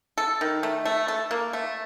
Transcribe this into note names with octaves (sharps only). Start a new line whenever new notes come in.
A4
D#3
A3
A3
A4
A#3
A3